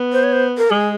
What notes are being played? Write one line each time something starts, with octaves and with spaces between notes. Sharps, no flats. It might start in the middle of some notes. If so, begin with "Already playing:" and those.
Already playing: B3
C5
C#5
C5
A#4
G#3 G#4